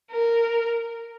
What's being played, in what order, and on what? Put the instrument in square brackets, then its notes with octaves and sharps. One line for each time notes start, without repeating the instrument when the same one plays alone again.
[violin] A#4